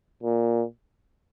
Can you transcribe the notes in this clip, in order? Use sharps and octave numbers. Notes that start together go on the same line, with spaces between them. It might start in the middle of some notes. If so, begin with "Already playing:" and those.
A#2